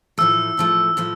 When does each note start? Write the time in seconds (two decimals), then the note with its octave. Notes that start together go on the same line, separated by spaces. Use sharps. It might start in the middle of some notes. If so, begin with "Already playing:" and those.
0.18 A2 F3 A3 E6
0.57 A2 F3 A3
0.97 A2 F3 A3